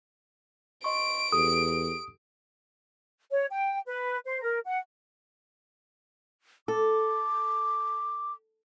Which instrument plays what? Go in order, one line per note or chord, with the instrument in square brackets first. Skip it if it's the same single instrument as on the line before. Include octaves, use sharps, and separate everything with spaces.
[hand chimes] D#5 C6 C#6 [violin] D7
[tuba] E2 [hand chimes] G4 A4 [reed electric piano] D#6
[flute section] C#5
G5
B4
C5
A#4
F#5
[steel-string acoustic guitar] A4 [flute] D6